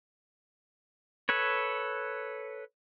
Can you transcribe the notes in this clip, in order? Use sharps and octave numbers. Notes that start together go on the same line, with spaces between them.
A4 B4 C#5